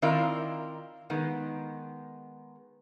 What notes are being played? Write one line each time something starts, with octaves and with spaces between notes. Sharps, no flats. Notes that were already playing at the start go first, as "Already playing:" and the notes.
D#3 C4 E4 F4 A#4 D5
D#3 G#3 B3